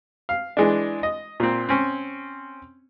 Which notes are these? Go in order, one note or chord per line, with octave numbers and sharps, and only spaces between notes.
F5
E3 G#3 D4
D#5
A#2 C4
C4 C#4